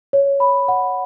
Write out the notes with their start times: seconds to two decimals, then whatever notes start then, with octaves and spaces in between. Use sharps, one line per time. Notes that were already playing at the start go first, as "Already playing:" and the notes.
0.13 C#5
0.40 B5
0.68 F#5